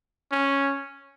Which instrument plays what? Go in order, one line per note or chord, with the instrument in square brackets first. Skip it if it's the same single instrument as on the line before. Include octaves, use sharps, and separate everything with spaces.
[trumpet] C#4